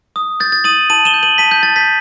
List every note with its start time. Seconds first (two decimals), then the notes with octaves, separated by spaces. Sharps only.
0.16 D#6
0.40 G6 A6
0.52 A6
0.64 D#6 D#7 F#7
0.90 A5 D#7 F#7
1.05 E7 G7
1.14 G6
1.23 D#7 F#7
1.38 A5 B6 D#7
1.51 G6
1.63 A5 A6
1.76 G6 B6